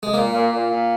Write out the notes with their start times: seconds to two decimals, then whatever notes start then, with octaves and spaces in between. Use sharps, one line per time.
0.03 G#3
0.14 A#2 A#3
0.32 A#2
0.51 A#2
0.70 A#2